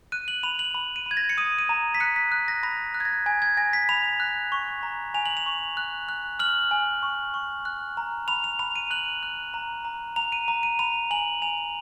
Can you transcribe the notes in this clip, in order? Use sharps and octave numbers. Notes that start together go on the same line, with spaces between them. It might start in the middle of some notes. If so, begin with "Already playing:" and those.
F#6 D#7
F#7
B5 F7
F#7
B5
D#7
B5 G#6
A#6
C#7
D#6 D#7
D#7
A#5
B6
F#6 C#7
B6
F#6
A#6
B5 A#6
F#6
G#6
A#6
G#5 G#6
G#6
G#5 A#6
B6
B5 F7
F#6
C#6
A#5
G#5 F7
F#7
F7
C#6
F#6
F#6
F6 F#7
G#5
C#6
C#6
F#6
A#5
B5 F7
F7
B5 F7
D#7
F#6 F#7
F#6
A#5
A#5
A#5 F7
D#7
A#5
D#7
B5 F7
G#5 F#7
G#5 F7